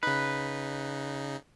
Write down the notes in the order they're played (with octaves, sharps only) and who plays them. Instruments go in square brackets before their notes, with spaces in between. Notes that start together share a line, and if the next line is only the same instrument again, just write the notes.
[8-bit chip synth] C#3 D#4 [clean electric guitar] B4